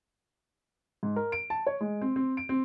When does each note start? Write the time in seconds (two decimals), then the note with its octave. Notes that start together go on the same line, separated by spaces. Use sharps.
1.03 G#2
1.16 A#4
1.32 D7
1.50 A5
1.67 C#5
1.81 G#3
2.01 C4
2.16 C4
2.37 D7
2.49 C4